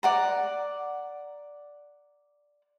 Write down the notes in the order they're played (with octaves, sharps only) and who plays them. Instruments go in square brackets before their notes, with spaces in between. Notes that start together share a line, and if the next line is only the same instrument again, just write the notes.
[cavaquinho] D5 F#5 A#5